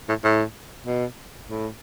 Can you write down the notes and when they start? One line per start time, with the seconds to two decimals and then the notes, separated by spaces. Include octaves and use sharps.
0.09 A2
0.24 A2
0.86 B2
1.49 A2